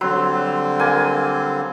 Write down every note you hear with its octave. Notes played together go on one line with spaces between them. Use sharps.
D3 F#3 G3 C4 C6
A#3 G#5